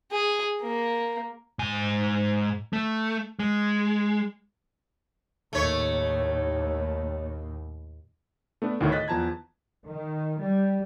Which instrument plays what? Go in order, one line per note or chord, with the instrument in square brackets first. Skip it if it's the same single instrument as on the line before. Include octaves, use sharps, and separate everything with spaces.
[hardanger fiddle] G#4
A#3
[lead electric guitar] G#2 G#5
A3
G#3
[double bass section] D#2 A2 [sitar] A3 C#5
[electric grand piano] A3 B3 D4
D2 A2 D#3 A3 C#5
D#5 F#6 A6 B6
E2 F3 A5 A#5 G#6
[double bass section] D#3
G3